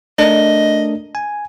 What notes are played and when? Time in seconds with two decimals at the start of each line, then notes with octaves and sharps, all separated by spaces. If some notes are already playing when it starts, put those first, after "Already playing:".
0.19 A3 D4 A#4 D#5
1.15 G#5